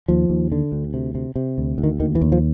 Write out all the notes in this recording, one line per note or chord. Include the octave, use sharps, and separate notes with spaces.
D#2 F3
D#2
D3
D2
C3
C3
C3
D2
D2
D#3
D#2 D#3
E3
D#2
F3